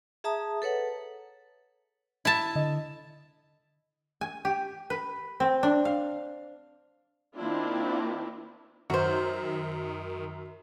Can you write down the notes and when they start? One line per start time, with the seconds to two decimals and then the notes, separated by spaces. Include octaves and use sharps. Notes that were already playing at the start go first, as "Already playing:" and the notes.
0.24 G#4 E5 A5 A#5 D#6
0.62 A4 B4 C#5 F#5
2.25 E4 A5
2.55 D3 D#5
4.21 G#5
4.45 G4
4.90 B4
5.40 C4
5.63 D4
5.85 F5
7.36 D#3 A#3 C4 D4 E4 F4
8.90 F#2 D#3 F#4 C5